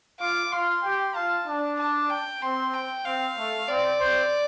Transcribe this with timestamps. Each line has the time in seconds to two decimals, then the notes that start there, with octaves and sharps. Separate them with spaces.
0.20 F4 F5 D6
0.52 F4 F5 C6
0.84 G4 G5
1.15 F4 F5 A5
1.46 D4
1.79 A5
2.10 G5
2.42 C4 C6
2.74 G5
3.05 C4 F5
3.36 A3
3.68 C4 D5
4.00 C4 C5